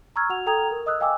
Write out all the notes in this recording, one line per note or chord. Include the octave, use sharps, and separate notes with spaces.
A#5 C#6 E6 F6 G#6
F#4 F#5 F7
A4 G5 A#5 D#6 G#6 F7
A#4
D#5 D#6 E6 F#6
D#5 F5 G5 G#5 D6 E6